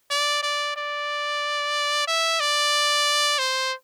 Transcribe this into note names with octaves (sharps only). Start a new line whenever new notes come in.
D5
D5
D5
E5
D5
C5